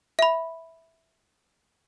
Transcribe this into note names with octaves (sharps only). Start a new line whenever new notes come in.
E5 B5